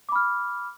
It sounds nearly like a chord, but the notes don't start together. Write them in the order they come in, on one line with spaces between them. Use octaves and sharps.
D6 B5 F6